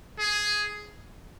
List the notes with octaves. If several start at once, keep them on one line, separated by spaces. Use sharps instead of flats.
G#4